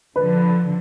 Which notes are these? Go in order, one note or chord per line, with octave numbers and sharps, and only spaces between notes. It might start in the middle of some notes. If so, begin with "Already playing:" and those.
D3 F3 B4